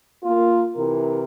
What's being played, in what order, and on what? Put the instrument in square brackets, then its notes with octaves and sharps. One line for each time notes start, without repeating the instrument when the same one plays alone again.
[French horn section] A#3 F4
C3 E3 A#4